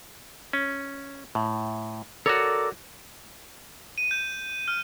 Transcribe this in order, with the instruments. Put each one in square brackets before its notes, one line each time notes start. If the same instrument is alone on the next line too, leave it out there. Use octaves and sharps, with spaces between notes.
[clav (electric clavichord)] C#4
A2
[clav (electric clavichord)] F#4 C#5 [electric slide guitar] A4 A#4 D5
[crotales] D#7
G6
F6